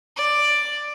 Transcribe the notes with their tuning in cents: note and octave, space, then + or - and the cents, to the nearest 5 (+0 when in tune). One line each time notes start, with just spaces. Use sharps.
D5 +5